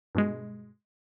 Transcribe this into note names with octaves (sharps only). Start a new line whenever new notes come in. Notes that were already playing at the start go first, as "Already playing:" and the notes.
G2 B2 G#3